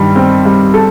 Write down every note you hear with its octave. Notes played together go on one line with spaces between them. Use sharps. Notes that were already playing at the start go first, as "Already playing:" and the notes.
Already playing: G2 D#3 G3
C4
G3
A4